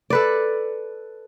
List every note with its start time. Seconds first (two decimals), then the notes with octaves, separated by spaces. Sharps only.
0.10 A4 B4 D5